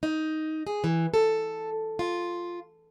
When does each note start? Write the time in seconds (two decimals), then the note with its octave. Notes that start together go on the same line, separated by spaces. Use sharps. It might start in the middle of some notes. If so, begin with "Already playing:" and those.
0.03 D#4
0.67 G#4
0.84 E3
1.14 A4
1.99 F4